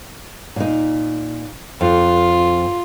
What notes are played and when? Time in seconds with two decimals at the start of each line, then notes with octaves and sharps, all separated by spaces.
0.56 A#2 D#4
1.81 F2 F4